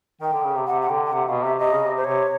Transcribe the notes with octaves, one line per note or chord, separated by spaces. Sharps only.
D#3 G5
D3
C#3
C3
C3 F#5
F#5
D3 G5
G5
C3 F#5
B2 F5
C3 E5
C3 D#5
C#3
C3
C5
C3 C#5